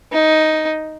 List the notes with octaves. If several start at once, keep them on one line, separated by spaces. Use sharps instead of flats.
D#4